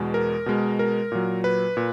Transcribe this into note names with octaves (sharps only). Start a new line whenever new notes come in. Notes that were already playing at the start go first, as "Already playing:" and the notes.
Already playing: E2 B2 G#3
A#4
B2 G#3
A#4
A#2 F#3
B4
A#2